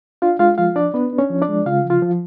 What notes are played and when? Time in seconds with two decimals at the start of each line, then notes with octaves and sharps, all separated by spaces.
0.22 D4 F4 F5
0.39 G#3 F4 F5
0.58 F3 F4 F5
0.76 D4 D5
0.94 B3 D4 B4
1.13 D4
1.18 C#4 C#5
1.30 F3
1.42 D4 D5
1.49 G#3
1.66 C#3 F4 F5
1.85 F3
1.90 F4 F5
2.02 F3